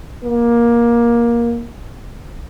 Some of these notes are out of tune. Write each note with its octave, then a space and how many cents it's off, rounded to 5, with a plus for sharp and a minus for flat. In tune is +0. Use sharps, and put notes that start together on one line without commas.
A#3 +15